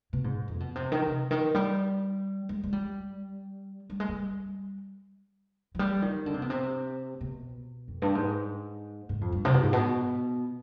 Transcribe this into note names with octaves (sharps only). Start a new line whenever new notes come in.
B2
G#2
F2
C3
B2
C3
D#3
C3
D#3
G3
G#3
G#3
G3
G3
G#3
G3
F3
G3
D#3
D3
C3
B2
C3
B2
F2
G2
G#2
G#2
F2
G2
C3
B2
G#2
B2